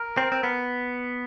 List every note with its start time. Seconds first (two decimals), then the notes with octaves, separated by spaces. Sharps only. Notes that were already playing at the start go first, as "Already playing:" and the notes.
Already playing: A#4
0.17 C4
0.32 C4
0.43 B3